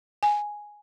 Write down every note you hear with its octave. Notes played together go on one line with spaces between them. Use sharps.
G#5